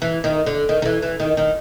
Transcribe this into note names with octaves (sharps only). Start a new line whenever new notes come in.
E3
D#3
D3
D#3
D#3
E3
E3
D#3
D#3